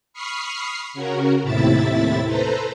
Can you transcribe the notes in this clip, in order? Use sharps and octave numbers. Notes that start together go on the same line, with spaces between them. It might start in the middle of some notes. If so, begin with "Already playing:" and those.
B5 C#6 D#6 F6 C7
C#3 C#4 F#4 A#4
D#2 A2 C3 E4 E5 A6
A4 B4 C5 A#5